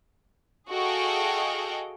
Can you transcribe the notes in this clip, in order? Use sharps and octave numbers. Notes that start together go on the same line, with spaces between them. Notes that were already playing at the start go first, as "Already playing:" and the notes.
F#4 G#4 A4 D#5 F5 G5